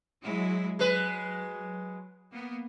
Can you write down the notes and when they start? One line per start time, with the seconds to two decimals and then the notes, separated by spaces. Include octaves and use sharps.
0.23 F#3 G#3 E4
0.79 F#3 G#3 B4
2.32 A#3 B3